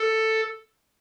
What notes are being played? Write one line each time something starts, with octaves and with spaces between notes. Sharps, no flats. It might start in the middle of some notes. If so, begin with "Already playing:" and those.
Already playing: A4